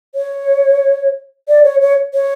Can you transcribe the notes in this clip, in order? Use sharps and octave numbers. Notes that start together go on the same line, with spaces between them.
C#5
D5
C#5
C#5
C#5